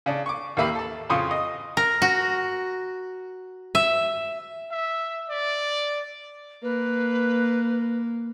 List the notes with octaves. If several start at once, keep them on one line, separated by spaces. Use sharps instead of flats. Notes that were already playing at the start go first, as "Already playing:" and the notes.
C#3 D4
C#6 D6
D#2 A#3 G4 E5 F5 B5
A4 A5
F2 C#3 F4 C6 C#6 D#6
D#5
A#4
F#4
E5
E5
D5
A#3 B4